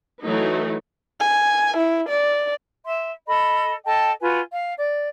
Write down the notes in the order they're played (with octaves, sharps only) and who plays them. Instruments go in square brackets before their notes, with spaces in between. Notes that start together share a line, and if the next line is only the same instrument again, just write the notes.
[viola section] E3 F#3 A3 D#4
[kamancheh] G#5
E4
D5
[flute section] E5 C6
A4 D#5 B5
A4 D#5 G5 A5
F4 F#4 B4 G#5
F5
D5